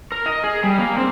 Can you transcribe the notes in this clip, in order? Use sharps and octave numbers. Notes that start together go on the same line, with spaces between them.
A#4
D#5
G#4
G3
A#3
C4